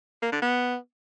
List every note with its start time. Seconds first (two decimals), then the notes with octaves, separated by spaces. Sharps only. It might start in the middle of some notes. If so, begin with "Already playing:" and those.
0.22 A#3
0.32 D3
0.42 B3